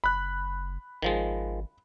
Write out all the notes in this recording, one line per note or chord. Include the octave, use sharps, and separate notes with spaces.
F#1 B5 F#6
G#1 D#3 F3 G#3